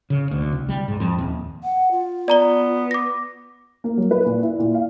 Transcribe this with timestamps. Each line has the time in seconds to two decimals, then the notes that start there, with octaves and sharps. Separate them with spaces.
0.10 C#3
0.31 D2
0.52 C2
0.69 G3
0.88 G#2
1.00 F2
1.18 D#1
1.63 F#5
1.91 F4
2.28 B3 D5 A#5 G7
2.91 D6 A#6
3.84 A#3
3.97 F#3
4.11 B4
4.26 A#2
4.43 E4
4.59 A#2
4.74 F5